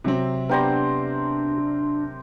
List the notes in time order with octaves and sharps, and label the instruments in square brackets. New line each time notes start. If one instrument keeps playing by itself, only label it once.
[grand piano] C3 F#3 C4
[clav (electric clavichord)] B3 G4 D5 [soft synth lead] D4 [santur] A#4 C5 A#5